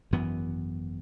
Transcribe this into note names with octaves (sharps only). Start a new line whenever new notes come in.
G#1 F#2 E3 B3